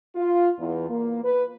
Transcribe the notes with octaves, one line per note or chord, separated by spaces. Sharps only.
F4
E2
A#3
B4